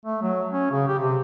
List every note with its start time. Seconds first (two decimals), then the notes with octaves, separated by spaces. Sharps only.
0.06 A3
0.22 F#3
0.52 C#4
0.72 C#3
0.88 G4
0.99 C3